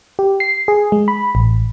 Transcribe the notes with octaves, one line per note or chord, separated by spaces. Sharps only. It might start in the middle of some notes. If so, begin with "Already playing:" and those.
G4
C7
G#4
G#3
B5
A1